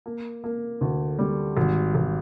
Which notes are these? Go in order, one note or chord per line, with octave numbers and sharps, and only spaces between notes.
A#3
A#3
D2
G3
G#1
G#1